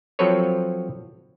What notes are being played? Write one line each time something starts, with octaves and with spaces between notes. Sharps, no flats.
F3 F#3 C4 A4 B4 C#5